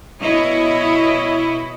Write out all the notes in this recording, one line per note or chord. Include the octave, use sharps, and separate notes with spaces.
B2 E4 C#5 D#5